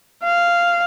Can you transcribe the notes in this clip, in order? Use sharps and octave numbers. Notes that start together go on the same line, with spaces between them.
F5